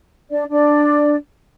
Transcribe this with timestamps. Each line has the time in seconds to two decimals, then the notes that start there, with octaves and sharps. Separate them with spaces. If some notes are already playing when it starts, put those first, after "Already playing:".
0.31 D4 D5
0.50 D4 D5